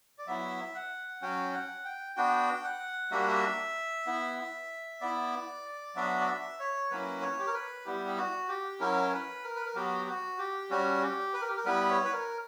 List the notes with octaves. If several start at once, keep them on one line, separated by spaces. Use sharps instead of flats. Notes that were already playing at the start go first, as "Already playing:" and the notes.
D5
F#3 B3 E4 E5
F#5
F#3 C#4 F#4 G5
F#5
G5
B3 D4 F#4 G5
F#5
G3 A#3 D4 F#4 E5
F#5
E5
B3 E4
B3 E4 D5
F#3 B3 D4 F#4 E5
D5
E5
C#5
F#3 A#3 C#4 E4 B4
C#5
G4
A#4
B4
G3 B3 E4 G4
G4
F#4
G4
F#3 C#4 E4 A#4
C#5
B4
A#4
B4
A#4
F#3 B3 F#4 G4
F#4
G4
G3 C#4 F#4
G4
B4
A#4
G4
A#4
G3 B3 E4 B4
C#5
B4
A#4